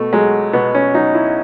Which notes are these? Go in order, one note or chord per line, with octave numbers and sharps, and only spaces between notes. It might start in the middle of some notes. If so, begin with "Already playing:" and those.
Already playing: B2 A3
F#3 G#3
B2 B3
C#4
F#3 D#4
E4